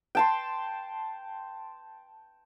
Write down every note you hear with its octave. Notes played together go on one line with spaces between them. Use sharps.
G5 A5 C6